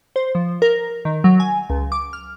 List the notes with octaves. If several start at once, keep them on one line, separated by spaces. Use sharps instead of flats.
C5
F3
A#4
D#3
F#3
G#5
C#2
D6
F6